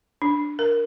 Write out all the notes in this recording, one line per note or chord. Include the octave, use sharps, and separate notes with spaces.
D4
A#4